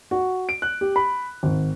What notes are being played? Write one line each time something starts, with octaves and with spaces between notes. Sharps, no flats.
F#4
D7
F#6
G4
B5
G#1